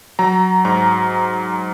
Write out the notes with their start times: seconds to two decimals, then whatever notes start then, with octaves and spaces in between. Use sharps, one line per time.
0.19 F#3 A#5
0.65 G#2 A#5